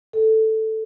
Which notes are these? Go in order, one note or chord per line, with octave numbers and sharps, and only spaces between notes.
A4